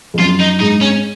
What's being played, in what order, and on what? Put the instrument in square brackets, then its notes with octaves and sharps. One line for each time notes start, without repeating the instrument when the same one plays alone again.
[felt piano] F2
[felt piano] F#2 [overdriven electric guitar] F4
[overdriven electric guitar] D#4
[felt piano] G#2 [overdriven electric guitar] D#4
[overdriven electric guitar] C#4